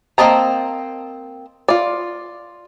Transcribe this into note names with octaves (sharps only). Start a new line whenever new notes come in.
A#3 C4 D#5 A5 A#5
F4 D5